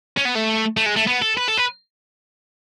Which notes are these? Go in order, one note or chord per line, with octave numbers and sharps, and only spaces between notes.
C#4
B3
A3
A3
G#3
A3
B3
A4
B4
A4
B4